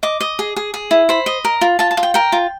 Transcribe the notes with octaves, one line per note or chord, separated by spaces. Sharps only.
D#5 D6
D#5
G#4
G#4
G#4
E4
C5 B5
D#5
A#4
F4
F4 A5
A5
F4
G5
A#4 G5
F4